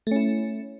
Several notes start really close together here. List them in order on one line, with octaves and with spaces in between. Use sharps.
A3 C#4 E4